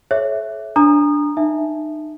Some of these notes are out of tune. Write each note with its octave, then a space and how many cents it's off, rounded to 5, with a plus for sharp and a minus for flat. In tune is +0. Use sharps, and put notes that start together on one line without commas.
A4 -40 C#5 -5 E5 +0
D4 +0 A#5 +0 D#6 -25
D#4 -35 E5 +0 A5 +0